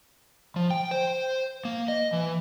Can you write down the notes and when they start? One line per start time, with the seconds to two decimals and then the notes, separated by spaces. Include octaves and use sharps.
0.56 F3
0.71 G5
0.91 C5
1.65 A#3
1.88 D#5
2.13 E3